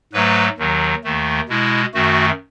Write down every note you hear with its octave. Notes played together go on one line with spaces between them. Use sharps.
G#2 F#3 A3 B4
D#2 D#3 F#3
D#2 D#3 A3
B2 G#3 E4
F#2 D#3 A3 F#4